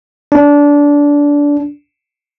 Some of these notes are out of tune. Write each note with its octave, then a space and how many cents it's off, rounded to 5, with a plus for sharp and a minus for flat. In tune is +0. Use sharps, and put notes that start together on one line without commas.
D4 -20